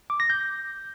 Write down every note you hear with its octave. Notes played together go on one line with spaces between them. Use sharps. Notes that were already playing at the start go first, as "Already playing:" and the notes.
D6
A#6
G6